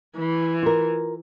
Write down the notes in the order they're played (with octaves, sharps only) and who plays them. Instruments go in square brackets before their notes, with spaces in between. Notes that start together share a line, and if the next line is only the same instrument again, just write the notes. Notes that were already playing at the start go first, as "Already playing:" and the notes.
[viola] E3
[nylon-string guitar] F4 A#4